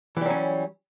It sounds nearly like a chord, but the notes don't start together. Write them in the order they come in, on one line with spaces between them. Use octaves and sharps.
E3 G3 F#3 C#4